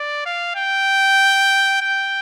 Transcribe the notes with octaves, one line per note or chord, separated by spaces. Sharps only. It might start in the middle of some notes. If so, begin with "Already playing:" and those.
Already playing: D5
F5
G5
G5